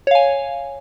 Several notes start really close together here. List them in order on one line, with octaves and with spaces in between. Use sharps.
C#5 F5 G#5